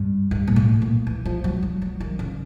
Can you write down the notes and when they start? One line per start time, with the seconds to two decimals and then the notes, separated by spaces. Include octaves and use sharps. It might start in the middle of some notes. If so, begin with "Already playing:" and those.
Already playing: G2
0.31 G2
0.48 A#2
0.56 A2
0.82 A#2
1.07 E3
1.26 F3
1.44 F#3
1.63 F#3
1.82 F#3
2.00 D#3
2.19 C#3